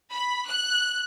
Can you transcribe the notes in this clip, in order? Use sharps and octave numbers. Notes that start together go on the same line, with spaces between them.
B5
F#6